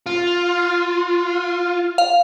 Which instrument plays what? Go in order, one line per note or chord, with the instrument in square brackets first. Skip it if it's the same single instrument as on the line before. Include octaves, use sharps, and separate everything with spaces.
[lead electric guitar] F4
[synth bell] F5